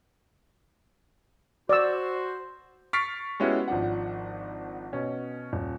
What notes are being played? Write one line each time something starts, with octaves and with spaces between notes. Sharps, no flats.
F#4 C5 D5 E6
C#6 F6 A6 B6 C7 D7
G#3 B3 C#4 E4 F#4 G4
G#1 F3 D4 F#5
B2 C#4
D#1